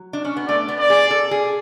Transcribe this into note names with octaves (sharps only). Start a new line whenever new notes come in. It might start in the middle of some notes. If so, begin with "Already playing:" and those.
Already playing: F#3
D4
C#4
B3
A3 D5
B3
D5
G#4
A4
G#4